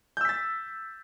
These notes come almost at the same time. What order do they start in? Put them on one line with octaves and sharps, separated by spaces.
G6 E6 B6 A6